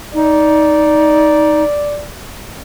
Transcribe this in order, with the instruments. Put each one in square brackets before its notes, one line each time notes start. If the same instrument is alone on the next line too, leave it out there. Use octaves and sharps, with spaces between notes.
[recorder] D#4 [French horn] D5